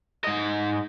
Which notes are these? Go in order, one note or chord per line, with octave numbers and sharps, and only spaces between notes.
G#2 D#5